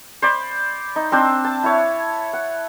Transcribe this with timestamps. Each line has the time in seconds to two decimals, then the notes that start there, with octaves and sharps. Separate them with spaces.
0.22 C5 D5 B5
0.96 D#4
1.12 C4 D4 C5 E6
1.45 A5
1.64 E4 C#5
2.33 F#5